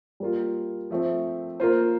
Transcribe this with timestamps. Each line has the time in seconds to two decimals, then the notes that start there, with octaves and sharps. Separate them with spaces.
0.20 G3 A#3 F4
0.90 F3 A3 C4
1.60 A#3 F4 C5